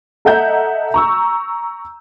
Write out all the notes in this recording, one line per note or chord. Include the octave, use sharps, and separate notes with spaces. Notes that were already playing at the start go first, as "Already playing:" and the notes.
A4 D#5 E5 F#5 A#5 G6
A#5 C#6 E6